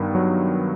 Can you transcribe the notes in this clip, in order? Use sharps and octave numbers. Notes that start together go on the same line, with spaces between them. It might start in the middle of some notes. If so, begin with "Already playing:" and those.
Already playing: G2 D#3 B3
F#3